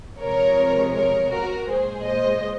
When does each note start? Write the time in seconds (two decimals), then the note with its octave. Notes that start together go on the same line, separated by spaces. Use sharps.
0.19 C3 F3 G#3 A#4 C#5
0.93 A#4 C#5
1.30 F#4 A#4
1.67 A#2 G#3 G#4 C5
2.04 C5 D#5